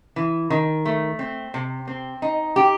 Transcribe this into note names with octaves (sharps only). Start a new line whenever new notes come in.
E3
D#3
A3
C4
C3
C4
D#4
G4